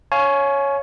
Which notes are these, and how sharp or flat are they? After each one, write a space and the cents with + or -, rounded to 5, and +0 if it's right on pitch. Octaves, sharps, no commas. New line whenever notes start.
C#5 +0 F5 -5 G#5 +30